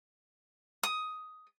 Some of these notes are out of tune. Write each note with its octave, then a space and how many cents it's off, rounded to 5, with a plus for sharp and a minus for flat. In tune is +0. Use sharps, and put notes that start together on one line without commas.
D#6 +10